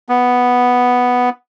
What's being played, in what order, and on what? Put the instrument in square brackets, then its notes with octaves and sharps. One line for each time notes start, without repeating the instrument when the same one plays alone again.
[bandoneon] B3